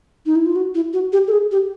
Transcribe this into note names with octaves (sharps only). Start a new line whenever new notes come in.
D#4
E4
F4
F#4
E4
F#4
G4
A4
G#4
G4